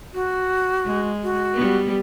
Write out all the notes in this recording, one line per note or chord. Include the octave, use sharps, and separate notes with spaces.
F#4
G#3
F#4
G3 B3